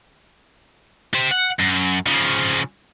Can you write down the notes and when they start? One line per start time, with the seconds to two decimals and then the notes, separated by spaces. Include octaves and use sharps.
1.14 G4 C5
1.31 F#5
1.59 F#2
2.06 C#3 F3